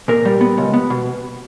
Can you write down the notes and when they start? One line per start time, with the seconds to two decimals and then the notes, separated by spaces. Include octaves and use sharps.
0.08 A#2 A#4
0.25 G3
0.41 B3
0.58 C#2
0.73 B3
0.90 B2